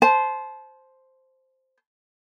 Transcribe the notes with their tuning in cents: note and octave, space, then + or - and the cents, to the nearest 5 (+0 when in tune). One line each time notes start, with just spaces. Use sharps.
C5 +0 A5 -30